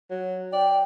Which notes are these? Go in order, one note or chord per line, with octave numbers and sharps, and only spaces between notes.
F#3
D5 G5